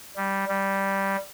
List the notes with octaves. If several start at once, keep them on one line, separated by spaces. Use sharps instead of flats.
G3
G3